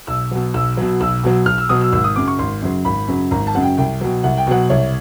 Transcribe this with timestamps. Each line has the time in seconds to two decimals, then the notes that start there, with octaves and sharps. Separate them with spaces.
0.07 B1 E6
0.31 B2 F#3
0.54 B1 E6
0.77 B2 F#3
1.00 B1 E6
1.24 B2 F#3
1.46 B1 F6
1.58 E6
1.69 B2 F#3 D#6
1.81 E6
1.93 G#1 E6
2.04 D#6
2.16 F#2 C#3 F#3 D6
2.28 C#6
2.39 G#1 C6
2.62 F#2 C#3 F#3
2.85 G#1 B5
3.08 F#2 C#3 F#3
3.31 G#1 A#5
3.47 A5
3.55 F#2 C#3 F#3 F#5
3.63 G5
3.77 C2 G5
4.01 B2 F#3
4.23 C2 F#5
4.37 G5
4.47 B2 F#3 F#5
4.70 C2 C#5